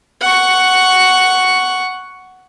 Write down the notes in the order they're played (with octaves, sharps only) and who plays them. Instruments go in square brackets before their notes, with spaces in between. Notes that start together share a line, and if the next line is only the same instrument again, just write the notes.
[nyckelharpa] F#5 C#6